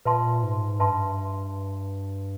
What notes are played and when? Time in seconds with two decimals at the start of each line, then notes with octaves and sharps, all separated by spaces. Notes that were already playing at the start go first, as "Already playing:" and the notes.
0.05 A#2 B4 E5 A5 C6
0.43 G#2
0.79 G2 B4 E5 A5 C6